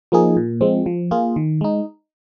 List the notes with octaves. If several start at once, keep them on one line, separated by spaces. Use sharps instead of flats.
F3 A#3 D#4 G#4
A#2
F3 G#3 C4
F3
A#3 F4 G#4
D#3
G#3 D#4